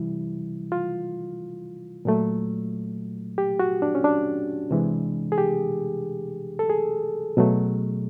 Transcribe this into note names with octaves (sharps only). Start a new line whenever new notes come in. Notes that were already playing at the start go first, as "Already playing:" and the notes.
Already playing: C3 E3 G3 E4
F4
A#2 F#3 A3
G4
F#4
D4
C#4
D4
C3 E3 G#3
G#4
G4
A4
G#4
B2 F#3 A3